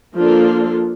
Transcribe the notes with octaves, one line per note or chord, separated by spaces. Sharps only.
F3 A#3 D4 F4 A4